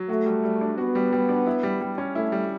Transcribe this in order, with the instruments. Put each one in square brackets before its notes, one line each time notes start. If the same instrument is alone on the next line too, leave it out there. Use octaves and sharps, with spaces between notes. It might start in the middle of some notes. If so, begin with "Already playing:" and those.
Already playing: [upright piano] F#3
[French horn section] A3 [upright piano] F#4
[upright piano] G3
G3
D4
[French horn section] B3 [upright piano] F#4
[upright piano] G3
G3
D4
E4
G3
G3
C#4
[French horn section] A3 [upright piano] E4
[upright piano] G3